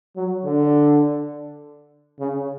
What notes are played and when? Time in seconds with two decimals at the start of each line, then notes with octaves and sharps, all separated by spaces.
0.16 F#3
0.45 D3
2.19 C#3